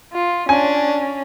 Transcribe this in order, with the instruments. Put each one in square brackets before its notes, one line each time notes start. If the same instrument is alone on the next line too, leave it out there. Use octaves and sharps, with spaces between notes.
[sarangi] F4
[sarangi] C#4 [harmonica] D4 [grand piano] G#5